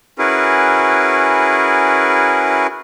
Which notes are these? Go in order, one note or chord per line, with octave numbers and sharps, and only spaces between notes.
C#4 E4 F#4 G#4 A#4 B4